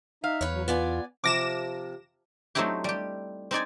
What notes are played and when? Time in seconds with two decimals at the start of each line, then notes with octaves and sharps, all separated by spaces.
0.24 D#4 E5 F5
0.41 E2 B4 C#5
0.53 F#3
0.68 B3 F4 D5 G#5
1.24 C3 F3 D6 A#6 E7
2.55 F#3 A3 C4 D#4 E4 G4
2.84 G3 G4
3.51 C4 D#4 D5 G#5